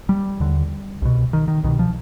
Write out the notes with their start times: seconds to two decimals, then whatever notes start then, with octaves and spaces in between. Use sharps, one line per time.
0.09 G3
0.40 D#2 D3
1.02 C2 B2
1.33 D#3
1.48 D#3
1.63 C2 B2 D#3
1.79 F3